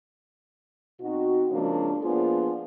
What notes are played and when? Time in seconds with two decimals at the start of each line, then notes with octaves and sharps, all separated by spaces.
1.01 B2 C4 D#4 F#4
1.51 C#3 F3 G#3 A#3 C4 D4
2.02 F3 A#3 B3 D4 F4 G#4